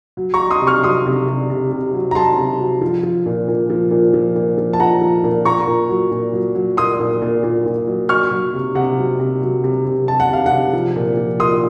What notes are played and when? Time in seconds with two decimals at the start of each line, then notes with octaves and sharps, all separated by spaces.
0.17 F#3
0.34 A#5 C#6
0.39 F#3
0.50 C6 D#6
0.61 C3
0.67 C#6 F6
0.83 F#3 C6 D#6
1.06 C3
1.28 C3
1.50 C3
1.72 C3
1.94 F#3
2.11 A#5
2.15 F#3 A5 C6
2.37 C3
2.59 F#3
2.81 F3
3.03 F3
3.26 A#2
3.48 A#2
3.70 F3
3.91 A#2
4.14 F3
4.36 A#2
4.58 F3
4.73 A5
4.79 A#2 F#5 A#5
5.01 F3
5.24 A#2
5.45 A#2 A#5 C#6
5.67 A#2
5.89 F#3
6.11 A#2
6.34 F#3
6.55 F#3
6.77 A#2 C6 D#6
7.00 A#2
7.22 A#2
7.43 A#2
7.66 A#2
7.87 F#3
8.09 F#3 C#6 F6
8.31 F#3
8.54 C3
8.75 C3 F#5
8.98 F#3
9.19 C3
9.42 F#3
9.64 C3
9.85 C3
10.07 C3 A5
10.20 F#5
10.29 C3 F5
10.46 C3 F#5
10.73 F3
10.96 A#2
11.17 F3
11.40 A#2 C6 D#6